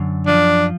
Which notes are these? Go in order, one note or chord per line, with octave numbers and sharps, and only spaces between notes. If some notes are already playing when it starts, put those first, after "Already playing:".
Already playing: F#2 D3
F3 D4